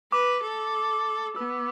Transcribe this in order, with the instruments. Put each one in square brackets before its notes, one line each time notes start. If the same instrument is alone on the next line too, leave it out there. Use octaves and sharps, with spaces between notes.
[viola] B4 [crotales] D6
[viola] A4
[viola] B3 [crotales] E6